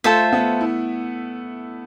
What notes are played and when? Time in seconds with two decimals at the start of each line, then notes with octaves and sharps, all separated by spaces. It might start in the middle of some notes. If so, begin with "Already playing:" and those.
0.04 A3 F4 A4 C5 E5
0.33 B3
0.61 E4